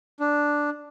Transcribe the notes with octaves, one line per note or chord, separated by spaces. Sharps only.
D4